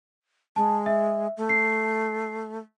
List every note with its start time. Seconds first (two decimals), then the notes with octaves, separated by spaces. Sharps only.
0.56 G#3 A5
0.86 E5
1.37 A3
1.49 C7